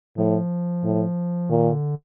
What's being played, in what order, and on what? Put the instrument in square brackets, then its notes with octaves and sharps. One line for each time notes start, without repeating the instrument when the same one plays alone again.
[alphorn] A2 [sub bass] F3
[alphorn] A2
[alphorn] A#2 [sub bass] D#3
[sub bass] D3